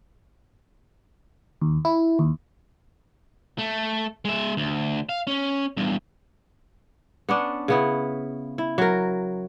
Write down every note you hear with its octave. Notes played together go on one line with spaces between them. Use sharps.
D#2
E4
D#2
A3
G#3 E5
D2
F5
C#4
E2 G2
B3 C#4 D4
C#3 B3 E4
E4
F#3 A#4